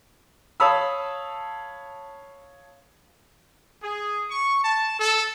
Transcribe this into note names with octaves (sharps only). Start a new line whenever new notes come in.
C#5 F5 A5 B5 D#6 E6
G#4
C#6
A5
A4